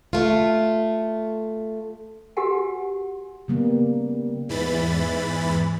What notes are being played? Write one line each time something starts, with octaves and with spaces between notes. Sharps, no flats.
A3 F4
F#4 G4 A#4 B4 F#5 G#5
C#3 G3 A#3 B3
E2 G#2 E3 B5 A6